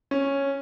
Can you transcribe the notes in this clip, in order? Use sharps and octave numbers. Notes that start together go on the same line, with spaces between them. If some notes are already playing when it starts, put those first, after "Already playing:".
C#4